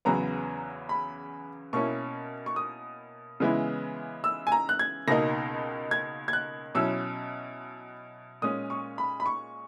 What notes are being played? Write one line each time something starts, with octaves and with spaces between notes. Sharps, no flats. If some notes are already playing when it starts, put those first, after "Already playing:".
E2 C#3 F#3 B3 A#5
B5
B2 A#3 C#4 E4 C#6
C#6
D#6
C#3 E3 G#3 B3 E4
E6
G#5
A#5
F#6
G#6
C#2 B2 A#3 D#4 A#6
G#6
G#6
F#6
B2 F#3 C#4 E4 E6
A#2 G#3 C#4 D#6
C#6
B5
B5
C#6